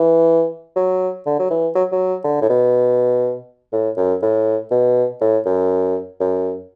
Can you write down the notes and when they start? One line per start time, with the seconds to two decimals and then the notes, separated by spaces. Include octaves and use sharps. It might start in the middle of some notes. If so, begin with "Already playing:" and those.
Already playing: E3
0.76 F#3
1.26 D3
1.39 F#3
1.50 E3
1.75 F#3
1.92 F#3
2.24 D3
2.41 A2
2.49 B2
3.72 A2
3.97 F#2
4.22 A2
4.71 B2
5.21 A2
5.46 F#2
6.20 F#2